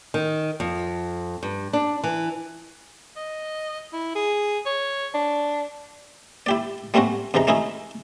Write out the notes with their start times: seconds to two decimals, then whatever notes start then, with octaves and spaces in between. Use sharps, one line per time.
0.14 D#3
0.60 F2
1.43 G2
1.73 D4
2.04 E3
3.16 D#5
3.93 E4
4.15 G#4
4.65 C#5
5.14 D4
6.46 E4 G4 D5
6.94 G3 A3 C4 C#4 F#4
7.34 E2 C3 E3 D#4 A#5
7.47 A3 C#4 D#4 E4 G#4